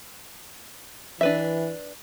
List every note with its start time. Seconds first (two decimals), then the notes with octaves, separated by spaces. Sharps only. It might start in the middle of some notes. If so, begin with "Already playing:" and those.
1.21 E3 D4 B4 E5